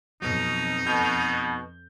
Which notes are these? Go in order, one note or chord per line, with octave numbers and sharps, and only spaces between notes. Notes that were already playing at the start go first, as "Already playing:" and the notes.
F2 B2 F#3 D#4
B2 G6